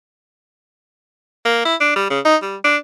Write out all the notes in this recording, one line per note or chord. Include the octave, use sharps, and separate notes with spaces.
A#3
E4
D4
G3
C#3
D#4
G3
D4